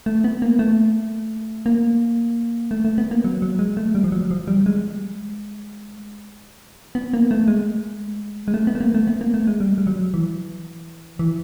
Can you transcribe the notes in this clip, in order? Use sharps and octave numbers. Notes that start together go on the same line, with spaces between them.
A3
B3
A#3
A3
A#3
A3
A3
B3
A#3
F#3
F#3
G#3
A3
G3
F3
F#3
F3
G3
G#3
B3
A#3
A3
G#3
G#3
A3
B3
A3
A#3
A3
B3
A#3
A3
G#3
G3
G3
F#3
E3
E3